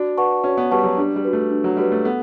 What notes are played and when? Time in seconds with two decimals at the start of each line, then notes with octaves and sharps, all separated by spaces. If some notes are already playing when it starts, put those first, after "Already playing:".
Already playing: D4 F#4
0.18 B4 F#5 A5 C#6
0.44 C#4 F#4
0.57 B3
0.71 G3 B4 F#5 A5 C#6
0.84 F#3
0.97 G3 D4
1.16 G3
1.25 F#4 B4
1.33 A3
1.51 D4
1.64 F#3
1.77 G3 F#4 B4
1.92 A3
2.05 B3 A4